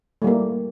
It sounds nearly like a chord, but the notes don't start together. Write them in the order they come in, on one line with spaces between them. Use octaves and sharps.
A3 G3 A#3